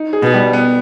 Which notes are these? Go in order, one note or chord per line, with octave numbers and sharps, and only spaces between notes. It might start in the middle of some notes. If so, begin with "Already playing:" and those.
Already playing: D#4
G#4
B2
G3
B3